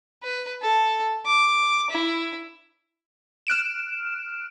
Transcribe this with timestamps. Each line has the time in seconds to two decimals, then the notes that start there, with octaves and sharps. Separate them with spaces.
0.23 B4
0.62 A4
1.26 D6
1.91 E4
3.47 F6 F#6 D7 E7